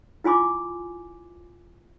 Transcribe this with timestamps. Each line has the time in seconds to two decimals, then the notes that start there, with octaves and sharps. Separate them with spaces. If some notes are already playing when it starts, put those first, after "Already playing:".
0.24 E4 F4 G#5 C6 D6